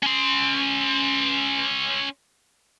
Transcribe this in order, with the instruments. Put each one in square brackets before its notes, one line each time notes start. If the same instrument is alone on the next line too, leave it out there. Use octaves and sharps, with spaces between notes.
[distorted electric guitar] C#4 C6